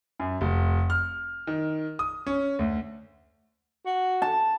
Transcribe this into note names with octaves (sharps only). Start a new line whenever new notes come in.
F#2
F1
F6
D#3
D#6
C#4
D2
F#4
A5